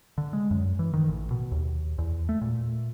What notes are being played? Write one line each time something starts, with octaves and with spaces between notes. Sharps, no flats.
D3
G#3
F#2
E3
D#3
A1
B2
D#2
E2
A3
A#2